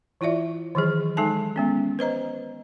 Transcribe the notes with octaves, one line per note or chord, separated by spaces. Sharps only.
E3 E4 F4 D5 E5
D#3 E3 F#3 G#4
G#3 D#4 A4 G#5 A5
G#3 B3 C#4
B4 C5 D#5 A#5